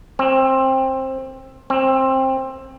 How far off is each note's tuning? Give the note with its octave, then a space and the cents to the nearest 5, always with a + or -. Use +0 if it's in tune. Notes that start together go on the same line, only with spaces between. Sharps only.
C4 +20
C4 +20